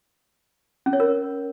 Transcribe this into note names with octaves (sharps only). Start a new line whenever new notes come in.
C#4
C#5
A#4